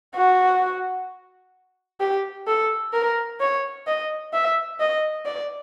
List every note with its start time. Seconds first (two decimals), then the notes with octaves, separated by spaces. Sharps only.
0.15 F#4
2.00 G4
2.47 A4
2.94 A#4
3.40 C#5
3.87 D#5
4.33 E5
4.80 D#5
5.26 D5